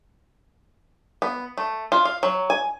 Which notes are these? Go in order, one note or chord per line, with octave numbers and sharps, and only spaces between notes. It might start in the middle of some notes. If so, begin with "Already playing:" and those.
B3
A3
F4
F5
F#3
G#5